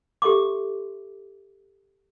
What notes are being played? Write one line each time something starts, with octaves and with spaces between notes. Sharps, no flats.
G4 A4 E5 C6 D6